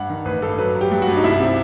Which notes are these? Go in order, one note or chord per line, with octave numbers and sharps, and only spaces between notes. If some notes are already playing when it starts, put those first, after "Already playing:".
Already playing: G2 F#5
D#3
A1 B4
G2 A4
F#3 B4
F#3
G4
G2
F#4
G2
D#4
C2 E4
C3